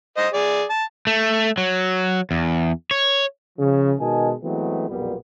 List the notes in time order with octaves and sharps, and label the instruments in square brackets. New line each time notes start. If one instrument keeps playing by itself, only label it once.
[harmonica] C5 D#5
G#4 D5
A5
[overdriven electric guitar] A3
F#3
E2
C#5
[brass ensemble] C#3 F3
B2 D#3 G#3 D#5 G#5 A5
E3 F#3 G#3 A3 B3 C4
B1 F2 A#2 G3 B3